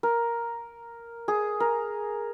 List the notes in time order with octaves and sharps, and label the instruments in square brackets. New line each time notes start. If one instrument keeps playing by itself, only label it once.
[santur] A#4
G#4
A#4